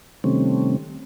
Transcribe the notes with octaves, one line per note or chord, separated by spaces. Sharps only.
C3 D#3 G3 A3 C4 C#4